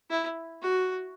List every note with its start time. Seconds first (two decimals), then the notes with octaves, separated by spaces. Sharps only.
0.10 E4
0.62 F#4